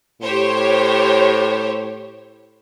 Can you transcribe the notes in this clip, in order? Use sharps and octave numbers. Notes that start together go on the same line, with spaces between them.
A2 G4 C5 C#5